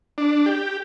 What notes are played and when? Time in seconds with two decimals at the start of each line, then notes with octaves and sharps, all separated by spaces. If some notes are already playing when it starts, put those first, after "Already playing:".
0.18 D4
0.46 G4